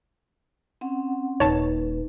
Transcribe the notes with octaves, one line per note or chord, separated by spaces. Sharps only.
C4 C#4 F#5
D#1 D#4 B4 C#5 A5